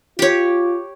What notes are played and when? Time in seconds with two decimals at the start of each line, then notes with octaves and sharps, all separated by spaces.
0.19 F4 G4 C#5